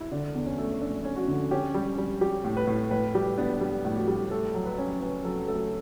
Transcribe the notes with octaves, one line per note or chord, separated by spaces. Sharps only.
E4
D3 D4
E2
C#4
A3
A3 D4
C#4
F#4
D3
C#4 G4
G3
G3
G3 G4
A2
B4
A2
A2 B4
G3 G4
B3 D4
G3
A2
F#4
G3
A3 A4
F#3
B4
C#4
C#4 B4
F#3 A4
A3 A4